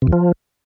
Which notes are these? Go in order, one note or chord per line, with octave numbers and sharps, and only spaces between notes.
C3
E2
F3